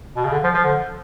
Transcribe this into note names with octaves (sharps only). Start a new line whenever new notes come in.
B2
C#3
D3
F3
F3
D3